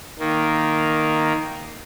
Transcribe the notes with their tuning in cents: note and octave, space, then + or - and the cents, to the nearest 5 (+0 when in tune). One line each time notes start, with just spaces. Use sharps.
D#3 +0 A#3 +0